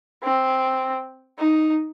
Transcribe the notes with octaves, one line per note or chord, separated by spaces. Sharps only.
C4
D#4